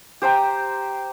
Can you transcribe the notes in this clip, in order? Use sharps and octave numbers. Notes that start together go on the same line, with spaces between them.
G4 C5 G5 A#5